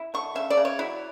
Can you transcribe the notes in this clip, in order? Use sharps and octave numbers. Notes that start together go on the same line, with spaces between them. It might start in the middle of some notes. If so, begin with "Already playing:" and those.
Already playing: E4
D3 C#6
C#3 E5
D5
C#3
C#5
F#3 E4